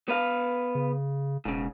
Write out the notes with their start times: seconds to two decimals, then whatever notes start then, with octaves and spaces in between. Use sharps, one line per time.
0.08 B3 B4 F5
0.75 C#3
1.45 E1 G#2 C#3